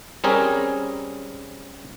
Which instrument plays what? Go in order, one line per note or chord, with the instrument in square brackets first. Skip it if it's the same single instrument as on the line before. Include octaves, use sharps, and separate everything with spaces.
[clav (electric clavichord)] G3 C4 C#4 G#4 A#4